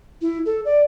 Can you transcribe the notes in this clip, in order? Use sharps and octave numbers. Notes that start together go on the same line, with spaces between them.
E4
A4
D5